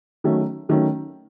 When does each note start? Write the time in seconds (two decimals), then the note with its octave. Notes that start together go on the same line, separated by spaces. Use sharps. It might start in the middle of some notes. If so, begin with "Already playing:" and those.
0.24 D#3 F#3 A3 C#4
0.69 D#3 F#3 A3 C#4